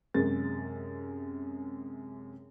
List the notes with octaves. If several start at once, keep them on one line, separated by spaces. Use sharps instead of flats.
F#2 C3 G#3 A6